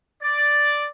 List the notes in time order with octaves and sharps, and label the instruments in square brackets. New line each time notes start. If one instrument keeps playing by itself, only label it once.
[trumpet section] D5